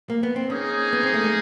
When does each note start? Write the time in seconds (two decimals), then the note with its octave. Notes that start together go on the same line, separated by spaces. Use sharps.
0.10 A#3
0.23 B3
0.36 C4
0.49 A#3 C#4 D#4 G#4
0.93 B3
1.03 C4
1.14 A3
1.24 G#3